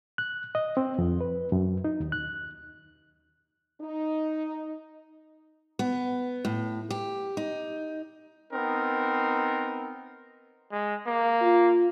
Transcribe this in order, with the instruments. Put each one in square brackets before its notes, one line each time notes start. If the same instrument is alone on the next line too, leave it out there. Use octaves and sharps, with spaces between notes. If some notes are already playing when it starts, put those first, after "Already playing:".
[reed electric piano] F#6
D#5
C4
F2
B4
F#2
D#4
D#2
F#6
[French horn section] D#4
[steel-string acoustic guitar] B3
A2
G4
D#4
[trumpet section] B3 C4 D#4 A#4
[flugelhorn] G#3
A#3
[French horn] F4